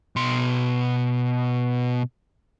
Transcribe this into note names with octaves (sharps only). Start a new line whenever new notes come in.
B2 C6